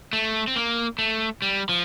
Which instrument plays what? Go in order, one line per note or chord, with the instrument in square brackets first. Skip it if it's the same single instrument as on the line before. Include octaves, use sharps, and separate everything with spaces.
[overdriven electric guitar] A3
C4
A#3
A3
G3
F3